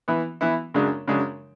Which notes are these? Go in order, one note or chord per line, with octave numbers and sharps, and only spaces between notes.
E3 B3 E4
E3 B3 E4
F#2 C#3 G#3 D4
F#2 C#3 G#3 D4